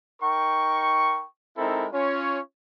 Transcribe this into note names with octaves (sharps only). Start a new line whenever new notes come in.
D#4 A#4 G5 C#6
G#3 C4 D#4 E4 A4 A#4
C#4 F4 C#5